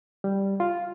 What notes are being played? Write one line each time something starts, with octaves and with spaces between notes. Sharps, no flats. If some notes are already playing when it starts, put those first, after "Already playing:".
G3
F4